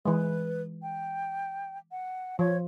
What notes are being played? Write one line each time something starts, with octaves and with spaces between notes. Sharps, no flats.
E3 G#3 B4
G5
F#5
F3 C#5